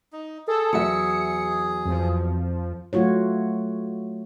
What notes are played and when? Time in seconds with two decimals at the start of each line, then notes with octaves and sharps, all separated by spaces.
0.13 D#4
0.47 G#4 A4
0.73 E2 F#3 E5 C#7
1.85 F2 F3
2.93 F#3 A3 F4 F#4 C#5